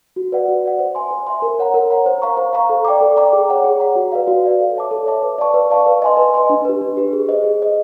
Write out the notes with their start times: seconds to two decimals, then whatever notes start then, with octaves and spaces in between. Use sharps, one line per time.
0.16 F#4
0.32 B4 D5 F#5
0.48 F#4
0.64 B4 D5 F#5
0.79 C5
0.95 E5 G#5 C6
1.11 C5
1.27 E5 G#5 C6
1.42 A#4
1.59 C#5 F#5 A#5
1.74 A#4
1.90 C#5 F#5 A#5
2.06 C5
2.22 F5 A#5 C#6
2.37 C5
2.53 F5 A#5 C#6
2.70 A4
2.85 D5 G5 A#5 D6
3.01 A4
3.17 D5 G5 A#5 D6
3.33 G#4
3.49 C#5 F#5 A#5
3.64 G#4
3.80 C#5 F#5 A#5
3.96 F#4
4.12 B4 D5 F5
4.27 F#4
4.44 B4 D5 F5
4.60 A4
4.75 C#5 E5 A5 D6
4.91 A4
5.06 C#5 E5 A5 D6
5.22 B4
5.38 D5 F5 A5 C#6
5.54 B4
5.70 D5 F5 A5 C#6
5.87 B4
6.02 D#5 G#5 C6
6.17 B4
6.34 D#5 G#5 C6
6.50 D4
6.65 G4 B4
6.81 D4
6.97 G4 B4
7.13 G#4
7.29 C5 D#5
7.44 G#4
7.60 C5 D#5